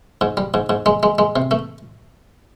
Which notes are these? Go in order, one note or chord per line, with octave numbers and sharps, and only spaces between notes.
G#2
G3
G#2
G#2
G#3
G#3
G#3
C3
A3